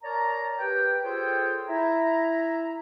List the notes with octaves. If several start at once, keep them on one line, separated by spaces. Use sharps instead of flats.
A#4 C#5 D5 A5 A#5
G4 B4 G5
F4 G#4 A4 C5 C#5 G5
E4 E5 A#5